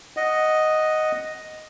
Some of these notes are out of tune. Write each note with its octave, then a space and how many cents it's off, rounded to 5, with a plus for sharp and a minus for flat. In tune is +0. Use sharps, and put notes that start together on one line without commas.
D#5 +0 F#5 +0